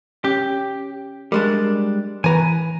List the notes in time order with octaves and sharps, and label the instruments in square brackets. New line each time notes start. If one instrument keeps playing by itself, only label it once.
[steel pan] C#4 [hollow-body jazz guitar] G4
[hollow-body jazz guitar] G3 G#3 D4 [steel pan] A#4
[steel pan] E3 B4 [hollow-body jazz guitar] G#5 A#5